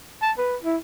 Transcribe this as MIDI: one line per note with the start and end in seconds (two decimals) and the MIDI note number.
0.22 0.32 81
0.38 0.56 71
0.64 0.78 64